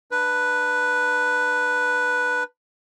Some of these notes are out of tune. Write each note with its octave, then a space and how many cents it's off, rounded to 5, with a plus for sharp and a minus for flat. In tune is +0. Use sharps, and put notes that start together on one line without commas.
D4 +30 B4 +0